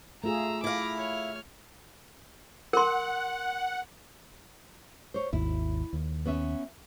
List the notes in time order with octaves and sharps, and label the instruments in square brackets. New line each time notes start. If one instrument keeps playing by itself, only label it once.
[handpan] A3 F4 G#4 [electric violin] A#5 E6
[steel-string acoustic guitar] E4 F5 [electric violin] D6 A#6
[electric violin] C#5 F6
[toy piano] A#4 C6 [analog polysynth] F#5
[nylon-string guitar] C5 C#5
[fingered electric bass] G#1 D#2 [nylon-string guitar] E4
[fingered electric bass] D#2
[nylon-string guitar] B3 C#4 E5